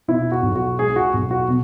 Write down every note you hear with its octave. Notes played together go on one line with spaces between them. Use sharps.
B2 E4
F#4
B1
F#4
G#3 G#4
F#4
B1
F#4
B2